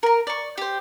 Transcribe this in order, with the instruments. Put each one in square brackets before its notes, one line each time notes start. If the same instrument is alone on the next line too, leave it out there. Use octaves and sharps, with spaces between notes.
[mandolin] A#4 A#5
D5 C#6
G4 C5